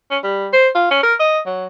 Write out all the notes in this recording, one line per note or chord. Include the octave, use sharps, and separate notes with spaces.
C#4
G3
C5
F4
C#4
A#4
D#5
F#3